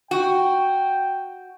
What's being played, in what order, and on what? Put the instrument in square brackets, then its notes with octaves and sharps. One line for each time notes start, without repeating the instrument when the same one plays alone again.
[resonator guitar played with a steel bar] F#4 [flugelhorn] G5